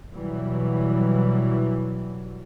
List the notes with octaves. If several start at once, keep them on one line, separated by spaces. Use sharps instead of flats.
B2 E3 F#3 G3